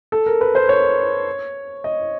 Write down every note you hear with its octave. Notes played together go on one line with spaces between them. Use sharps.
A4
A#4
B4
C5
C#5
D#5